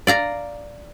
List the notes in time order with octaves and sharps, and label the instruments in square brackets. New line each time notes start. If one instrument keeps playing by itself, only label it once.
[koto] D5 F5 A#5